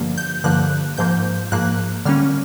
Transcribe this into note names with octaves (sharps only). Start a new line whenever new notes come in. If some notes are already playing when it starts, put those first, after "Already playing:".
Already playing: G2 D3 F3 A#3
G6
G2 D3 F3 A#3 F#6
G#2 F3 A#3 G6
G#2 F3 A#3 F#6
D3 G3 A#3 C#4 F6